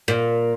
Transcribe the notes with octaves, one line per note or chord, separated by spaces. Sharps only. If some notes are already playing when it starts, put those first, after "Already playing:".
A#2